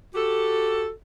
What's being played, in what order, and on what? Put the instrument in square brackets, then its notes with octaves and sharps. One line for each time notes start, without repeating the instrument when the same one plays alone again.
[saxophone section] F#4 G4 A4